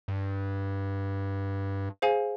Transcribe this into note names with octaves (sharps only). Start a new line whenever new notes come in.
G2
G#4 C5 F5 G#5